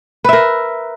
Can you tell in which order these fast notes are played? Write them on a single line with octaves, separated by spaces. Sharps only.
B4 E5 A#4